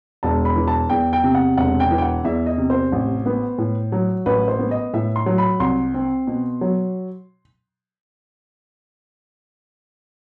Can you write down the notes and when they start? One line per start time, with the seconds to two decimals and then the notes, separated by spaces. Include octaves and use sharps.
0.23 E1 A5
0.45 B5
0.56 E3
0.68 A5
0.90 E2 G5
1.13 G5
1.24 C3
1.35 F#5
1.57 E1 F#5
1.80 G5
1.91 E3
1.98 G5
2.02 F#5
2.24 E2 E5
2.46 D#5
2.58 C3
2.70 C5
2.92 A1
3.26 B3
3.58 A2
3.92 F#3
4.26 A1 B4
4.48 C5
4.59 B3
4.71 D#5
4.94 A2 E5
5.16 C6
5.26 F#3
5.38 B5
5.60 C2 C6
5.94 C4
6.27 B2
6.61 F#3